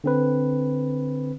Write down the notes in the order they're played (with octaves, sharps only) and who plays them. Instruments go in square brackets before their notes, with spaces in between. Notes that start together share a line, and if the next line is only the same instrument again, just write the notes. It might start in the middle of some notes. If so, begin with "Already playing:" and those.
[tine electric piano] D3 C4 B4